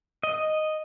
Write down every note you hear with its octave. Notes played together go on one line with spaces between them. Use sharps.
D#5